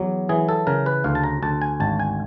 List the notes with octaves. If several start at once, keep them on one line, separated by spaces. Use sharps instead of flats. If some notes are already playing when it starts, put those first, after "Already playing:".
Already playing: E2 F#3
E3 G#4
A4
C#3 A#4
B4
D2 F5
A5
A#5
D2 A5
G#5
G#1 A5
G#5